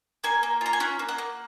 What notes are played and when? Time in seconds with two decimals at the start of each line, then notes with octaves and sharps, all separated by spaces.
0.24 A#3 G#5
0.43 A#3
0.61 F4 A#5
0.73 G#5
0.80 C#4 F#5
0.99 A#3
1.08 F#5
1.18 A#3